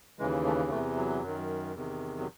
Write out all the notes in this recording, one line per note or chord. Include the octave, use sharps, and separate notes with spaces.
D#2 C#3 E3 G#3
A3
E2 C3 E3 A3
F#3
F#2 D#3
E2 C3 D#3
F#3